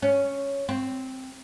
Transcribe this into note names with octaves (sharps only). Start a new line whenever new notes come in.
C#4
C4